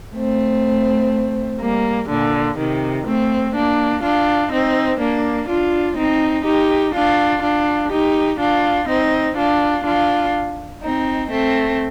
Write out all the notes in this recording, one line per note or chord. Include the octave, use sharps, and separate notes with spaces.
A3 C4
G3 A#3
A#2 D3
C3 D#3
A3 C4
A#3 D4
D4 F4
C4 D#4
A#3 D4
D4 F4
C4 D#4
D#4 G4
D4 F4
D4 F4
D#4 G4
D4 F4
C4 D#4
D4 F4
D4 F4
C4 D#4
A3 C4